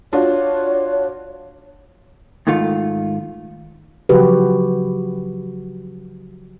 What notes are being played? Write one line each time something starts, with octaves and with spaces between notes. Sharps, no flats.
D4 F4 F#4 C#5
G#2 D#3 A3 F4
C#3 F3 F#3 F#4 G4 B4